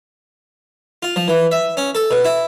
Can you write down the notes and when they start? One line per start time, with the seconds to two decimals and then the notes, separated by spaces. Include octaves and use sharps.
1.03 F4
1.16 F3
1.28 E3
1.52 E5
1.77 C#4
1.95 A4
2.11 B2
2.25 E4